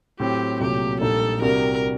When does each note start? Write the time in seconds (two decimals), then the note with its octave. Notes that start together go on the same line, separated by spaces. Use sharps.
0.20 A2 F#3 C4 G4
0.61 C2 A#2 F#3 A3 G4
1.01 A#1 A#2 G3 A#3 D#4 A4
1.42 C2 C3 G3 D4 F#4 A#4